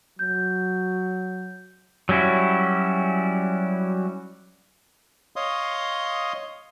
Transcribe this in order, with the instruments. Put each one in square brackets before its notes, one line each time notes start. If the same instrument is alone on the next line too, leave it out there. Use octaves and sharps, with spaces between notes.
[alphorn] F#3 [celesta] G6
[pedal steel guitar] F#3 G3 C#4 E4 F#4
[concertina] C#5 D#5 F5 C6 D#6